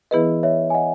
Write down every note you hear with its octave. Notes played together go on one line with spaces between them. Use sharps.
E3 B3 E4 G#4 B4 D#5
C#5 E5
G#5
D#5 F#5